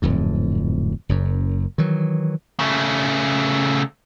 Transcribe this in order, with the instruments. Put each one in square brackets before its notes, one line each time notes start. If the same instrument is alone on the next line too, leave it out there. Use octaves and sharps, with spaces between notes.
[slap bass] D1 F2 G#2
F#1 F#2
D#3 E3 F#3
[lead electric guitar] C#3 A3